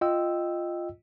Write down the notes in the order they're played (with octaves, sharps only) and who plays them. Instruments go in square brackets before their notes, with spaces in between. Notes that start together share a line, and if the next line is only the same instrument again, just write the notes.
[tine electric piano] F4 D#5 G5 E6